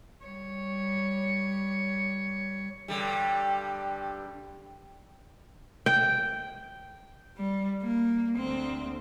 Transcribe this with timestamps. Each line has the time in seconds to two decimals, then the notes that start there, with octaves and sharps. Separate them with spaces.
0.25 G3 C#5
2.88 G2 D3 G3
5.86 G5
7.38 G3
7.83 A#3
8.37 D2 C4